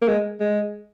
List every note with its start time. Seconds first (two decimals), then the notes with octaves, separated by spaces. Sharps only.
0.02 A#3
0.08 G#3
0.40 G#3